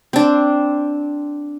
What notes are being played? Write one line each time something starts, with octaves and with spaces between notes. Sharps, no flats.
C4 D4